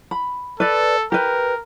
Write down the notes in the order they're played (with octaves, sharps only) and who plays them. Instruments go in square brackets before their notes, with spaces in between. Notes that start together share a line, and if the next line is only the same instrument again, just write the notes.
[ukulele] B5
[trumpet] A4 [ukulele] B4 D5
[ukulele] G4 B4 [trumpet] A#4